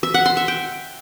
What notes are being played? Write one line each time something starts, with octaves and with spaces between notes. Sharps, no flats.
E5
F#5
C6
E5
G5